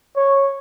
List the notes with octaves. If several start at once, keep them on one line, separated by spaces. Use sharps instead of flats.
C#5